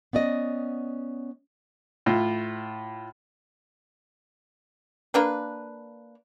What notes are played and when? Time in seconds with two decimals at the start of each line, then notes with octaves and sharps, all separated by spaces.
0.13 B3 C#4 D5 D#5
2.06 A2 F4
5.14 A#3 D4 B4